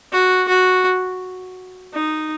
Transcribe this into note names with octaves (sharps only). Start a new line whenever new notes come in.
F#4
F#4
D#4